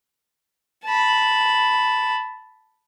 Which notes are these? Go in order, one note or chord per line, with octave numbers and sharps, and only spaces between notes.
A5 B5